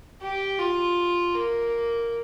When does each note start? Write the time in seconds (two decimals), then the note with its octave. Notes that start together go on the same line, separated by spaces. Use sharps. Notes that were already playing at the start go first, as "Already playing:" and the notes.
0.22 G4
0.59 F4
1.34 A#3